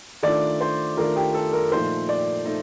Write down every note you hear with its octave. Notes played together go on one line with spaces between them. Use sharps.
D#3 A3 D4 F4 D5
C5
D#3 A3 D4 F4 A#4
G4
A4
A#4
A#2 F3 A3 D#4 C5
D5
A3 D#4